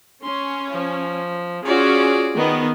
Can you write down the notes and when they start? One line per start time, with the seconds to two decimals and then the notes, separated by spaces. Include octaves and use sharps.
0.23 C#4 C6
0.70 F3
1.65 C#4 F4 F#4 G#4 D5
2.35 D#3 B3